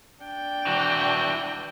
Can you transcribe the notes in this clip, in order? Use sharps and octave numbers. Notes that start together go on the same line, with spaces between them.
D4 G5
E3 F#4